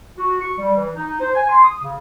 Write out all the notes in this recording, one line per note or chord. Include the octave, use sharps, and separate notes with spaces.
F#4
C#6
G3
E3
D#4
C5
G#5
C6
D#6
C#3